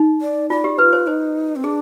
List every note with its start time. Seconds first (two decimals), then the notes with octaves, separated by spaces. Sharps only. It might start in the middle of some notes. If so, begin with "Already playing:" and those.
Already playing: D#4
0.21 D5
0.50 F4 D5
0.64 G4
0.78 F4 B4
0.93 C5
1.07 D#4 C5
1.56 C4
1.64 D4 G#4